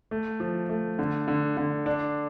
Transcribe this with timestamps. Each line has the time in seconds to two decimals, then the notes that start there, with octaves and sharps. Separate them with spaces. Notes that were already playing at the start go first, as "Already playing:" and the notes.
0.11 A3
0.40 F3
0.69 A3
0.99 D3
1.28 D3
1.57 D3
1.86 D4